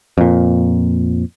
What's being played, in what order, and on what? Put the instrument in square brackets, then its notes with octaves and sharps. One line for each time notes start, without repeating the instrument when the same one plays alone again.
[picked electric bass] F2 A#2